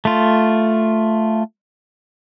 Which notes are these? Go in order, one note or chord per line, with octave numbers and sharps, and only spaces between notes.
A3 F4